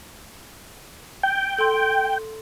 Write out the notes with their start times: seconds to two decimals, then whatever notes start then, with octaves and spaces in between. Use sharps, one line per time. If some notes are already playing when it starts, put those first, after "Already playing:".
1.23 G5
1.58 A4 C6